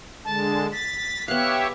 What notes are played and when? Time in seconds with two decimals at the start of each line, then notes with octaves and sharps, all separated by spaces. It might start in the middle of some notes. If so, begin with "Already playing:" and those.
0.25 D3 G#3 A5
0.72 A6 B6
1.28 B3 G4 C#5 E5 F5 F#6